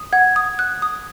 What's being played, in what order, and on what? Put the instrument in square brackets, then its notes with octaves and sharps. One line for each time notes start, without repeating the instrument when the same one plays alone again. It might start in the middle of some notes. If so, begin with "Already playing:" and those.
Already playing: [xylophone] D#6
[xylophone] F#5 [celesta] G#6
[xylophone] D#6
F#6
D#6